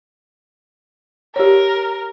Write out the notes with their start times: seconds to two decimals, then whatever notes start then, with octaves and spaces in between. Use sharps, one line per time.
1.36 G4 A#4 C#5